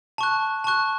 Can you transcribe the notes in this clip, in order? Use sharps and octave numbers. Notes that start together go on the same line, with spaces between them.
A5 C#6 F#6
A5 C#6 F#6